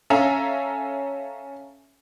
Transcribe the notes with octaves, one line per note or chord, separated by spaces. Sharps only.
C#4 A4 E5 F5 G#5 A#5